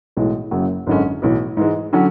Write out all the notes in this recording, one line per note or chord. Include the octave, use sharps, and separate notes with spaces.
B1 A2 E3 G#3
F#1 F#2 C#3 F#3
G#1 F#2 D3 G#3 C#4
B1 A2 E3
G#2 E3 G#3
D3 F#3 C#4